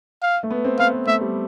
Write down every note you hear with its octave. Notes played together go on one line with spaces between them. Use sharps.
F5
A3
B3
C4
B3 F5
B3
A3 E5
G3